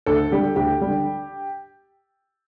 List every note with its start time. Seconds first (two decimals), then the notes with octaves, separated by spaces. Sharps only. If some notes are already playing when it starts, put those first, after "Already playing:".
0.06 D2 A4
0.31 D3 G3 G4
0.56 D2 G4
0.81 G3
0.86 D3